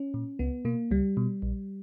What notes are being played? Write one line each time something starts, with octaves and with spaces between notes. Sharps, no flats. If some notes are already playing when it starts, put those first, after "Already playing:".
Already playing: C#4
A#2
C#2 B3
B2 A#3
C#2 G3
B2
A#1